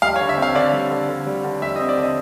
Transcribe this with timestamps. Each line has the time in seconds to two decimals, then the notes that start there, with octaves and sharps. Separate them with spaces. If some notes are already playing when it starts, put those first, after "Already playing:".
0.02 G3 F5
0.16 C#5
0.20 D3
0.29 E5
0.37 C4 F5
0.55 D3 D5
0.73 G3
0.91 D3
1.09 D3
1.27 G3
1.44 D3
1.62 G3 E5
1.76 C4 D#5
1.89 D5
1.97 D3
2.03 D#5